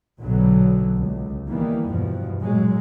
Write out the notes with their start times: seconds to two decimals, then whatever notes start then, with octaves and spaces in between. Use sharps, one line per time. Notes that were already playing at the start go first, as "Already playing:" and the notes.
0.23 B1 B2 D3 F#3 B3
0.97 C#2
1.48 D#3 E3 G3 A#3 B3
1.89 E2 G2 B2 F3
2.40 A#2 F#3 G#3